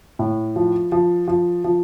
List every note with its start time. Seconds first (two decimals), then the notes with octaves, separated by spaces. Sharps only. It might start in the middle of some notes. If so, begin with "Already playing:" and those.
0.19 A2
0.56 F3
0.92 F3
1.28 F3
1.64 F3